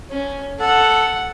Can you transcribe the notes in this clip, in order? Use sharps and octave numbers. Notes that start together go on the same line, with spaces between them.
C#4
A4 F#5